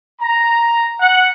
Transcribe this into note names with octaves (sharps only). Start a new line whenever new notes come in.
A#5
F#5